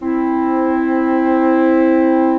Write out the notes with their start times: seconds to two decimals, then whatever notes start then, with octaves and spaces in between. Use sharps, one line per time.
0.02 C4 E4